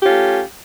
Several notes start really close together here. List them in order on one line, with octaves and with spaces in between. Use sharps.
G4 F4 C#4 A3